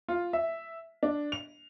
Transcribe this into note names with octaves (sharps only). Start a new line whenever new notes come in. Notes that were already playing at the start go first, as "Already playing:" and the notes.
F4
E5
D4
F7